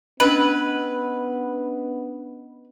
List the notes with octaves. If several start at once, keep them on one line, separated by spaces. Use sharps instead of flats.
B3 C#4 D4 B4 D#5